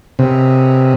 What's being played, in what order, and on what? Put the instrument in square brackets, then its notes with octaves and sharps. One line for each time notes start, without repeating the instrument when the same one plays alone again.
[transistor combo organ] C3